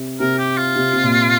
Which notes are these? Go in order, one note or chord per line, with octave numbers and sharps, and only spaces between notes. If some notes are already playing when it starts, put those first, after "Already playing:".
Already playing: C3
C3 A#4
G4
F4
C3
C3
A#2